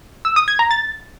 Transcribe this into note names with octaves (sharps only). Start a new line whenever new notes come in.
E6
D#6
G#6
A#5
A6